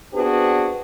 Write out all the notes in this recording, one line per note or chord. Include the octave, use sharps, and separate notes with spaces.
B3 C4 D4 F#4 G#4 B4